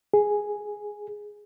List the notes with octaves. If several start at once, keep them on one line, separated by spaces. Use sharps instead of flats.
G#4